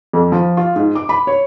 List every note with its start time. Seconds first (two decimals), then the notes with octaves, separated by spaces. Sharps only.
0.13 F2
0.32 F3
0.57 F4
0.76 G#2
0.95 D6
1.09 B5
1.27 C#5